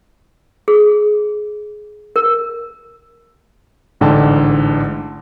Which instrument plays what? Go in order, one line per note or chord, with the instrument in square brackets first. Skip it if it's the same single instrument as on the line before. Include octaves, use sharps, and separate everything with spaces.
[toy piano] G#4
A#4
[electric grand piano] A1 G#2 D3 G5 A5